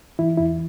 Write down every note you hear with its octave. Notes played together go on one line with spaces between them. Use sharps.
E3 E4
E2 E4